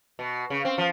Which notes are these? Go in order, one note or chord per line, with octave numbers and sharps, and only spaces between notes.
B2
C#3
C4
F3